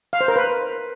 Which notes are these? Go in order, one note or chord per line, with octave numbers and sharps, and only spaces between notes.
F5
C5
A#4
B4